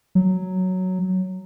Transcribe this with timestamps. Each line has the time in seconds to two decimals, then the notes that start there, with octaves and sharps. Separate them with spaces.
0.15 F#3